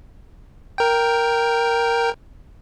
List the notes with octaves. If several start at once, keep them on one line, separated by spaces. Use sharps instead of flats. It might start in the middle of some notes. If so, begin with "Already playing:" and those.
A#4 G5